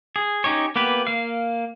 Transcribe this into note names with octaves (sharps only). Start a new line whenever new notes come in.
G#4
C#4 D#4 G4 C#5
A#3 B3 G4 B4
A#3 F5